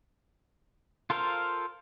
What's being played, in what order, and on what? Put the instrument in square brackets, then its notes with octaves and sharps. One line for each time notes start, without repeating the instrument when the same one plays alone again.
[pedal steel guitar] F4 A4 A#4 C5 F5